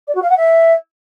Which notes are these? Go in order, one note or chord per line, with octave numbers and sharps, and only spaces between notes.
D5
F#4
F5
F#5
E5